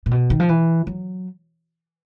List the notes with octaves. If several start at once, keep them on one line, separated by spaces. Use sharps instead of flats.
A#2
B2
D#3
F3
E3
F#3